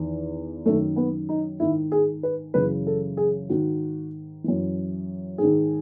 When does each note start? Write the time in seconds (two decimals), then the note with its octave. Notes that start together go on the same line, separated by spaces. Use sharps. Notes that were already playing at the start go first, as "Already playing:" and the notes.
Already playing: E2 D#3
0.66 F#2 D#3 A3
0.96 B3
1.29 D#4
1.60 G#2 D#3 E4
1.92 G#4
2.23 B4
2.54 F#2 C#3 E3 B4
2.87 A4
3.17 G#4
3.49 G#2 D#3 F#4
4.44 F#2 E3
5.38 G#2 D#3 G#4